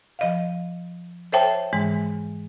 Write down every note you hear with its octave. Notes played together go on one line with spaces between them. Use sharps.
F3 D#5 F5
A4 C5 C#5 E5 G5 A5
G#2 E3 G#3